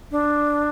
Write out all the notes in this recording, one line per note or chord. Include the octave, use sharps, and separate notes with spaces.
D4